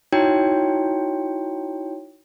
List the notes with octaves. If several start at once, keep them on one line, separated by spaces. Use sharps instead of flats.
D#4 E4 F#4 C#5 G5